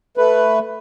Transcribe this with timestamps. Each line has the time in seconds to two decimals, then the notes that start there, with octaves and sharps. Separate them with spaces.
0.17 A3 B4